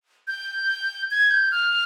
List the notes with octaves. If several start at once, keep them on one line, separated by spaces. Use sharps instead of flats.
G6
G#6
G6
F6